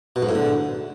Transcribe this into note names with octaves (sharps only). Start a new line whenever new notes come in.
B2
G#2
A2
D3